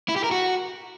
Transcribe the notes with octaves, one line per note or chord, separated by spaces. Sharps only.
E4
G4
A#4
F#4